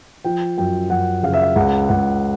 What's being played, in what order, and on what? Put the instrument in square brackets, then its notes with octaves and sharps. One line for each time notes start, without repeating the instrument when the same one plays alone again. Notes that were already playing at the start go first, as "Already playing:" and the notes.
[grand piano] F3 G5
F#2 G5
F#2 F#5
C#3 F5
E5
F5
C#2 F#5
C#2 F#5